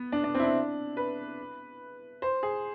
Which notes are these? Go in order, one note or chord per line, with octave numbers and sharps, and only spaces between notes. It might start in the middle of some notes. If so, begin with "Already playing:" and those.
Already playing: B3
D4
D4
C4
E4
D4
B4
C5
G#4